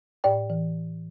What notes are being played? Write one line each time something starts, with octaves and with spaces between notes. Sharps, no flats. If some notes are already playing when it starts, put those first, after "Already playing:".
A2 D5 G5
E3